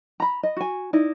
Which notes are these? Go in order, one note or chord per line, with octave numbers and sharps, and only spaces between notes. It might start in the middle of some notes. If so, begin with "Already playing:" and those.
A#5 B5
D#5
F#4 G#5
D#4 E4 D5